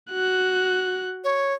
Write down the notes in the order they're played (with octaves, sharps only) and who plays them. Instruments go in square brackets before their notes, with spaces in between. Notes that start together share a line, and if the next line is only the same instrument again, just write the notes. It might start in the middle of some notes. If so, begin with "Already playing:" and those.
[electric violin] F#4 F#6
[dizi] C#5